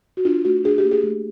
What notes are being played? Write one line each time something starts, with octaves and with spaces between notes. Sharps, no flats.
F#4
D4 F4
A3 F#4
D4 G#4
G4
A#3
G#4
A3